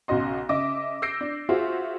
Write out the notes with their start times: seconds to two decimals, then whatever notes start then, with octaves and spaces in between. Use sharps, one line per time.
0.08 B1 C#3 F#4 D#5 C6
0.49 C#3 D#5 E5 D6
1.02 E6 G6 A#6 C7 D7
1.21 D4
1.49 F4 F#4 G#4 C5 E5